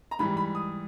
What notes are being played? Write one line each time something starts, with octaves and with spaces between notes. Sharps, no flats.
A#5
G#2 E3 G3 B5
B5
D#6